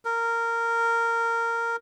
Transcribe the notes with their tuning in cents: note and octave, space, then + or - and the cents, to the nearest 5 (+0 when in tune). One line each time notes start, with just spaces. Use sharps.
A#4 -15